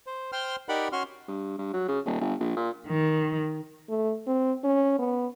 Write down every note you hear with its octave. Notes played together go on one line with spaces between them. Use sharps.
C5
C5 G5 C6 F6
D#4 G4 A#4 D5 F#5 B5
C#4 F#4 C6 F6
G2
G2
F#3
C#3
D#1
G1
A#1
A#2
D#3
A3
C4
C#4
B3